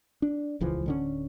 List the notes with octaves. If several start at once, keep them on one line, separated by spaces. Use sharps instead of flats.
D4
D#1 C#2 E3 F3
D1 D3 C#4